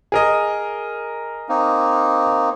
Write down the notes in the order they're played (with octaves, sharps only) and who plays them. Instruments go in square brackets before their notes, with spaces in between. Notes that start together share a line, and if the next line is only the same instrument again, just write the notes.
[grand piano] G#4 A#4 D#5
[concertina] A#3 C4 D#4